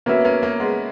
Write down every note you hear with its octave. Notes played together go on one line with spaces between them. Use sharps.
A#3 B3 C#4 F#4 B4 E5
A#3 C#4
A#3
G#3 B3